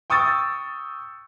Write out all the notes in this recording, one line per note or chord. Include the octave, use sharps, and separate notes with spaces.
G5 C#6 D#6 E6 A6